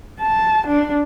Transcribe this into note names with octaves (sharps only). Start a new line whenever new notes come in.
A5
D4